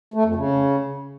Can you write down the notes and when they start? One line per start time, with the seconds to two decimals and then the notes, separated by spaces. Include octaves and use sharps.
0.14 A3
0.25 F2
0.36 C#3